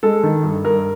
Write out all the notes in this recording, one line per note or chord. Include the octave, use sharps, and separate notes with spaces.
G#3 A4
D#3
G2
G2 A#4